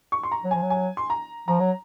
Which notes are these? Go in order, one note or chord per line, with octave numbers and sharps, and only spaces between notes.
C#6
C6
A#5
F#3
F3 G#5
F#3
G#5
C6
A#5
F3 A#5
F#3